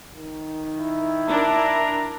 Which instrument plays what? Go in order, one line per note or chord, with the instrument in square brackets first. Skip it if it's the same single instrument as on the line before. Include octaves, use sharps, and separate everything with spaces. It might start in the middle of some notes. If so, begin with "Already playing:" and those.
[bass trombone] D#3
[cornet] E4
[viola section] D4 A#4 [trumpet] A#5